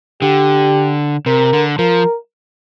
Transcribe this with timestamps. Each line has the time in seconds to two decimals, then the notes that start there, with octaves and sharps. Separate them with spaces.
0.22 D3 G4
1.26 C3 A#4
1.53 D3
1.79 F3 A#4